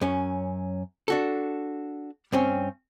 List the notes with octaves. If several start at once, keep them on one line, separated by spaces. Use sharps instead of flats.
F#2 C#4
D4 F#4 A4
G2 C4 C#4